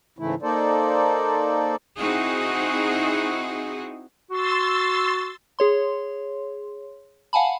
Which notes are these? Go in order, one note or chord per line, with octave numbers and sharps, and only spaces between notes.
G#2 C#3 E3 A3 E4
A#3 D#4 A4 C5 D5
C4 D#4 E4 F#4 G#4
F#4 C6 E6 A6
G#4 C#5 C6
F5 F#5 G#5 A5 B5